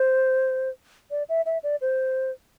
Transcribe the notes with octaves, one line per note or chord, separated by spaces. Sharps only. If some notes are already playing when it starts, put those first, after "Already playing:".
Already playing: C5
D5
E5
E5
D5
C5